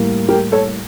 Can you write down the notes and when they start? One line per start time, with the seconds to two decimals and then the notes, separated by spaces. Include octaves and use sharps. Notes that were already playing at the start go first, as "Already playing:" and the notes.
Already playing: A2 G3 A#3
0.28 G4 A#4
0.52 A4 C#5